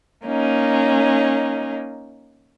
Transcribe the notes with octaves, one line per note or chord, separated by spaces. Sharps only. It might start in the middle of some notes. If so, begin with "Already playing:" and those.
A#3 C#4 D#4